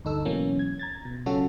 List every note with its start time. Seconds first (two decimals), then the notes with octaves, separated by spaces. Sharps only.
0.05 D2 G2 D#4 A4 E6
0.25 B2 E3 F#3 A#3 C#4
0.59 G#6
0.79 A#5 G#6 A6
1.05 B2
1.26 C#3 F#3 C#4 F4 F#4 A4